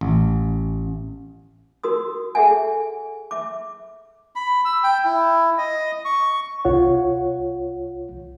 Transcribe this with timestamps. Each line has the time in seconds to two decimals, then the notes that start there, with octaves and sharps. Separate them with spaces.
0.01 A1
1.84 F#4 A#4 C6 D#6
2.35 G#4 A4 E5 F#5 G#5
3.31 E5 D6
4.36 B5
4.65 E6
4.84 G5
5.05 E4
5.58 D#5
6.05 C#6
6.65 C2 F4 C#5 F#5